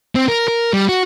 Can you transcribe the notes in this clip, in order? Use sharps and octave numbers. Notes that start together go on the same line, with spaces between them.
C4
A#4
A#4
G3
F#4